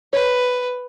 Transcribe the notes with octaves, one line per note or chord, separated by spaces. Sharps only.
B4 C#5